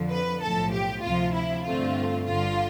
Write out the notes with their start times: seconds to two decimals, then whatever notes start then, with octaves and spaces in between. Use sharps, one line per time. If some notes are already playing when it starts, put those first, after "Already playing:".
Already playing: F2 D3 F3
0.10 B4
0.42 B1 A2 F3 A4
0.73 G4
1.03 D2 C3 F3 F4
1.34 E4
1.65 G2 D3 A3 C4 F4
2.27 G1 G2 D3 F4